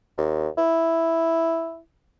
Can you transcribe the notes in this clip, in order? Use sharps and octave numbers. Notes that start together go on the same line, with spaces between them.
D#2
E4